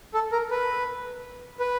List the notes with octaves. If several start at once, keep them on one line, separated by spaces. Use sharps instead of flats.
A4
A#4
B4
B4